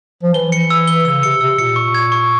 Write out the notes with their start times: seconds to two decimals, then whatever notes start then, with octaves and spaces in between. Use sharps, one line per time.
0.23 F3
0.34 E3 G7
0.52 C#7
0.70 E6
0.88 G7
1.05 C#3 E6
1.23 C3 C#7
1.41 C3 E6
1.58 A#2 C#7
1.76 C#6
1.95 G#6
2.12 C#6